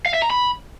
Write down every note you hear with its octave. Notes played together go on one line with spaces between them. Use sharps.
F5
E5
A#5
B5